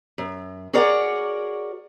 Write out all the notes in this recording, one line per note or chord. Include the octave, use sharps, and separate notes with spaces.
F#2
F#4 G#4 A#4 C#5 D5 F#5